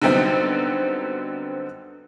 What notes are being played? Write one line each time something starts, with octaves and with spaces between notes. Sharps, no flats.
D3 F#3 G3 B3 C4 D#4